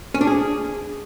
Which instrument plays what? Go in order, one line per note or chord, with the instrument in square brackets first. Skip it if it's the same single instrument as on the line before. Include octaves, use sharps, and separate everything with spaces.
[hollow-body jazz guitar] C#4
D4
G#4